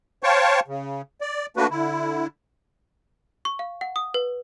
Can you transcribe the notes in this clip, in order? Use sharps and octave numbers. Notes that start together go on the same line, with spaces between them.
C5 C#5 F5 G5 A5 C#6
C#3
D5
A3 A#3 D4 F#4 B4
D3 E4
C#6
F5
F#5
D#6
B4